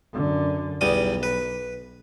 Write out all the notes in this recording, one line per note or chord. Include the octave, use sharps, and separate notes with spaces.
F#2 D3
B1 E2 G3 D#6
B4